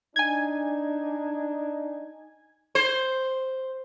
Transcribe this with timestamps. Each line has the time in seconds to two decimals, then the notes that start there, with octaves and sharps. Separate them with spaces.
0.16 D4 D#4 G#5 G#6
2.75 C5